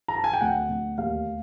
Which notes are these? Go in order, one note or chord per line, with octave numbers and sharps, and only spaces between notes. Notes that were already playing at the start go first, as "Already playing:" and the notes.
A#5
A5
G#5
G5
D2 F#5
D2
D#2 F5